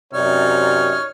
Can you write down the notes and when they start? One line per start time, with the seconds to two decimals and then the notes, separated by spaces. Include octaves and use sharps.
0.14 F#2 C3 D#4 C#5 D5 F6